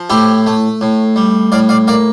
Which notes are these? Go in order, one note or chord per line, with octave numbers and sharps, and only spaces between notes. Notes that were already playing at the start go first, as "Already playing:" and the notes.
Already playing: F3
A2 E4 G4
A3
A2
G3
A2 D5 F5
D5 F5
A#3 D5 F5